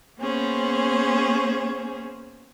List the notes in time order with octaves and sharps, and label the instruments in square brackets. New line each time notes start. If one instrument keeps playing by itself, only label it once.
[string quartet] A#3 B3 C#4 G#4 C5